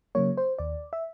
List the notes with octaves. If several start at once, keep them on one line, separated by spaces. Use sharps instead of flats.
C#3 F#3 A#3 C#5
C5
D#2 D5
E5